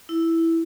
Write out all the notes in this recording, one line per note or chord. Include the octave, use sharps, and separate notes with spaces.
E4